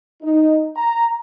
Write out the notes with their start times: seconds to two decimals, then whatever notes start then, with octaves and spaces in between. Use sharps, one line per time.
0.22 D#4
0.76 A#5